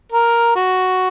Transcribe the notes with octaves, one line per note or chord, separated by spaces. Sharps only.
A#4
F#4